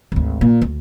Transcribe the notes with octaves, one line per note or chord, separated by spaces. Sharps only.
G#1 D2
A#2
D2